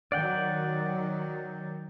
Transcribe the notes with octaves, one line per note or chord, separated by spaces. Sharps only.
D#3 F#3 D5 F#5 G5